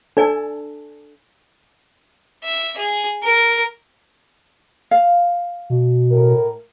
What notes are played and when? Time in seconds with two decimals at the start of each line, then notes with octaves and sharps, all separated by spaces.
0.17 D4 A4 D5 G#5
2.43 E5
2.78 G#4
3.23 A#4
4.91 F5
5.70 B2
6.12 A2 A#4